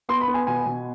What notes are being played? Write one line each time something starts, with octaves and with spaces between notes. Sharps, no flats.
B3 C6
B5
B3
G#5
B2 G#5
B2